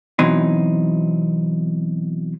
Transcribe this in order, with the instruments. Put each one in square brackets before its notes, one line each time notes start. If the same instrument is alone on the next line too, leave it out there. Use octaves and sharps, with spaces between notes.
[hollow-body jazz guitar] B2 E3 F#3 C4 D#4